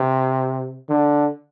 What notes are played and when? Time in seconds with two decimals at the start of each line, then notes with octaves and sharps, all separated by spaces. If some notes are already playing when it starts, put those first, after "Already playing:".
Already playing: C3
0.89 D3